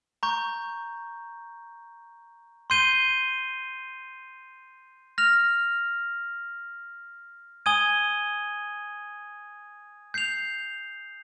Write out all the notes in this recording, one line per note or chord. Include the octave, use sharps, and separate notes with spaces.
A#5 C#6 G6
C6 G6 C7 D#7 G7
F6 A#6 F7
G#5 D#6 G#6 D#7 G7
G6 C7 F7